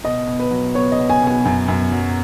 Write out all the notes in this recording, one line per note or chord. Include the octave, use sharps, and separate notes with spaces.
B2 D#5
B2
B4
F#3
B3 C#5
D#5
B2
G#5
B2
G#5
F#2
F#2
F#3